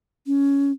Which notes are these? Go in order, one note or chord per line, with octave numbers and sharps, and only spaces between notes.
C#4